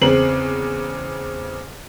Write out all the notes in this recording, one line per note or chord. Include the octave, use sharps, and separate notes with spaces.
E2 C#3 C4 C7 F#7